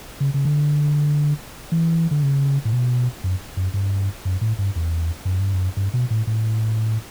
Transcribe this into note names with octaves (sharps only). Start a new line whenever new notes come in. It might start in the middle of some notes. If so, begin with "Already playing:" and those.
C#3
C#3
D3
E3
D3
C#3
A2
B2
F#2
F#2
G2
F#2
A2
G2
E2
F#2
G2
F#2
G2
B2
A2
A2